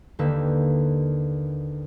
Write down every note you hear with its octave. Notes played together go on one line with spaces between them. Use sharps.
D#2 D3 A#3 G4 B4 E6